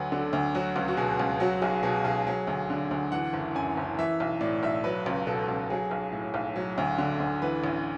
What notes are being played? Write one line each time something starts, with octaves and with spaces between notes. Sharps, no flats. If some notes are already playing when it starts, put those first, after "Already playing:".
Already playing: D2 F#3 B4
D3 A4
D2
F#3 F#4
C#2
F#4
B2 G#4
C#2
F#3 F#4
B1 G#4
B2 G#4
B1 G#4
F#3
D2
D3
D2
E3 F#5
F#1
F#2 G#5
F#1
E3 E5
B1
A2 D5
B1 E5
F#3 B4
C#2
B2 A4
C#2
F#3 G#4
B1
A2
B1
F#3
D2
D3
D2
E3 B4
A1